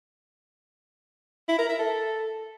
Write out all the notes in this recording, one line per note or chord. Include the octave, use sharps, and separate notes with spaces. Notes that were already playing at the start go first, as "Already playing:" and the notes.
E4
A#4
E5
A4